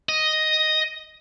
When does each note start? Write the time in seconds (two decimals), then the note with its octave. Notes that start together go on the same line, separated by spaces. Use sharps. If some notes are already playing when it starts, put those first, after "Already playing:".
0.09 D#5